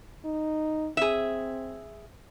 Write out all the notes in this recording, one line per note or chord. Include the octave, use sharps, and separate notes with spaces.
D#4
C4 G#4 E5